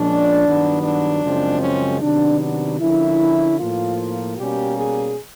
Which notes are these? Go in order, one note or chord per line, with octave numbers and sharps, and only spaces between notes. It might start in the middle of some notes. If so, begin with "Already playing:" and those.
Already playing: A#2 F3 G#3 C#4 D4
G2 D#3 F#3 B3
D4
F#2 C#3 F3 G#3 C4
C#4
C3 D#3 F#3 B3 D4
D4
D3 F3 A#3 C#4 E4
A2 F3 A#3 F4
B2 G3 A#3 C#4 G4
G#4